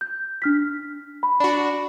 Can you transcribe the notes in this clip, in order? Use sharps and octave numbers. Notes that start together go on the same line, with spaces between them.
G6
D4 F6 B6
B5
D4 F#4